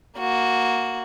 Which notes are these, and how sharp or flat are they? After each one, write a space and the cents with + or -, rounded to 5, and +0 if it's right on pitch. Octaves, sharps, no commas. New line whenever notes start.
A#3 +0 F#4 +0